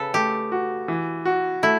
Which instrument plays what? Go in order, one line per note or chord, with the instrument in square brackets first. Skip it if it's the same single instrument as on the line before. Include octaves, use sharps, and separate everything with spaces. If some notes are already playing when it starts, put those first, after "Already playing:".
Already playing: [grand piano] C#3 [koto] A4 B4
[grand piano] A3 [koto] G4
[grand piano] F#4
E3
F#4
[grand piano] A3 [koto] E4